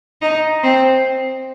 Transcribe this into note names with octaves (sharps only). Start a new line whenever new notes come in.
D#4
C4